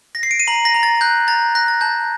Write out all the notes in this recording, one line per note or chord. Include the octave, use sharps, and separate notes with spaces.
A#6
C7
D7
D#7
A#5 F#7
A#6
A#5
A6
F#6 G6
A#5 A6
F#6 A#6
A6
A5 G6